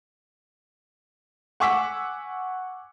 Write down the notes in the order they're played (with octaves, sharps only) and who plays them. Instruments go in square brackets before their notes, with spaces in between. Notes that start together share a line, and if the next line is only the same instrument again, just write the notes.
[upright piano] F#5 G#5 C#6 D6 E6 B6